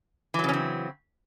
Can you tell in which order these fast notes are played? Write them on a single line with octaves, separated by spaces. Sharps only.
E3 F#3 C#3 C#4 C4